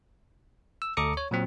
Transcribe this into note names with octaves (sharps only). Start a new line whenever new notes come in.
E6
D2 A4 A#5 D6 D#6 C#7
C#5
A#2 F#3 C4